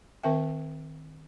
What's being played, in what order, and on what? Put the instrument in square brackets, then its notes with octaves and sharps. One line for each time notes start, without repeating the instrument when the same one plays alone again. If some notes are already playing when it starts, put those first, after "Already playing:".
[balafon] D#3 C4 A#4 E5 G5